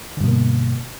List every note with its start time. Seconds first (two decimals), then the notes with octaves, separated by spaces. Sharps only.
0.17 D3
0.21 G2
0.24 B2
0.27 A#3